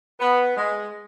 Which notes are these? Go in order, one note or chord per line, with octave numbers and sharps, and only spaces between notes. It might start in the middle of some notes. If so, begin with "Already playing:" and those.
B3
G#3